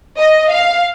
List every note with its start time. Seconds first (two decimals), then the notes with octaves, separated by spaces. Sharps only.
0.20 D#5
0.51 F5